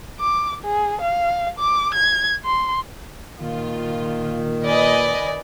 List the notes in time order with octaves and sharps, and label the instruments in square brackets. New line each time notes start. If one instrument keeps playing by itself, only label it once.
[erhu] D6
G#4
F5
D6
G#6
C6
[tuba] A#2 [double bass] D#3 [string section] F4
[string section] B4 D#5 G#5 [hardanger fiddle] D5